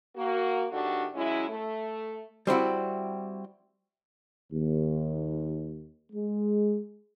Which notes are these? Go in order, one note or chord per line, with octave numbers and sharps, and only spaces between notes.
A#3 F#4
A2 D#3 A3 D4 F#4 G4
F#3 G#3 C#4 E4
A3
G3 C4 E4 F#4
D#2
G#3